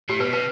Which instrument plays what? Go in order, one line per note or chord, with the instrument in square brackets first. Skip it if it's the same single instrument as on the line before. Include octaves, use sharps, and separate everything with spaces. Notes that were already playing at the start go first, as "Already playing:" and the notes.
[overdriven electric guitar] A2 [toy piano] G4
[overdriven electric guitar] B2 [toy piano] B4
[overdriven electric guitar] C3 [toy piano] B4